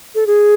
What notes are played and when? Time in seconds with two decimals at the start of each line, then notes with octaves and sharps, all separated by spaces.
0.15 A4
0.27 G#4